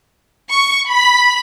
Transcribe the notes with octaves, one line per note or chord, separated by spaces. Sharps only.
C#6
B5